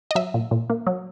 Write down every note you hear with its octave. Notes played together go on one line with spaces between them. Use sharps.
D#5
F#3 E5
A#2
A#2
A#3
F#3